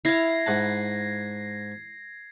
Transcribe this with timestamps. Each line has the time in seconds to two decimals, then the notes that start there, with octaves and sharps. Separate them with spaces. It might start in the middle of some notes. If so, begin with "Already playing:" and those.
0.05 E4 F5 G#6 A#6 C7
0.46 G#2 F#5 A5